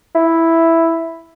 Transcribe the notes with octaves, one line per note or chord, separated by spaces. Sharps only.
E4